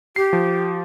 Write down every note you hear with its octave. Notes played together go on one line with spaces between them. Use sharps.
G4 C7
F3